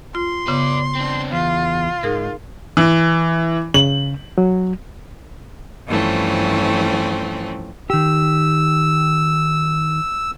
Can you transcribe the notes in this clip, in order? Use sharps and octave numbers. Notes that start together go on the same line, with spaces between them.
F4 C6
C#3 B3 B4 D5
C4 D4
E2 F4
G#2 D#4 G#4 A#4
E3
C#3 F#7
F#3
G2 E3 F3 A3 C4 C#4
D#3 G4 E6